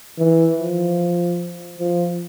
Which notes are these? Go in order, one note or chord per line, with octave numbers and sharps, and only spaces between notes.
E3
F3
F3